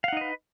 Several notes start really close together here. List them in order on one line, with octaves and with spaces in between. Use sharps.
F5 F#5 D#4 D#5 B4